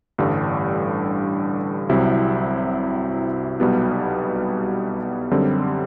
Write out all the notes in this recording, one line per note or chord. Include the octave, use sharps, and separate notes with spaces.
A1 G2 D3 G3
C2 C3 F#3 C4 E4
B1 B2 G3 B3
F#2 D3 G3 C4